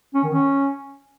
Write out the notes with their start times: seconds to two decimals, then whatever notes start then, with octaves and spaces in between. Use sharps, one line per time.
0.14 C#4
0.23 D#3
0.33 C#4